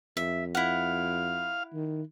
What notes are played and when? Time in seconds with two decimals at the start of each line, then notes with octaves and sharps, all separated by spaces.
0.17 F2 E5
0.55 E4 F5 F#5
1.74 D#3